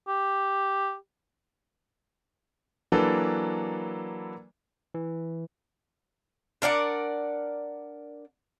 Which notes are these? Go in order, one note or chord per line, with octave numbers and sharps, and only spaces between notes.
G4
E3 F#3 A#3 D4 A4 B4
E3
D4 A#4 D5 F#5